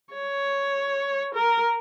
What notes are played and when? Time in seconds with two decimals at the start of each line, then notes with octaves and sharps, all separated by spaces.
0.14 C#5
1.35 A#4